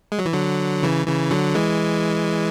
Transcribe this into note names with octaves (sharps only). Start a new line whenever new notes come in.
G#3
F#3
E3
D3 F#3
C#3 E3
C#3 E3
D3 F#3
E3 G#3